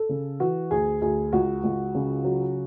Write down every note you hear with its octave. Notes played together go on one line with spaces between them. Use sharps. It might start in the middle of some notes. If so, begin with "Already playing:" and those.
Already playing: A4
C#3
E3 F#4
D2 G#4
D2 G#4
C#2 F#4
C#2
C#3
F#3